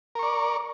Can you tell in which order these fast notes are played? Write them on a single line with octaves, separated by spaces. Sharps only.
A#4 C#6 D5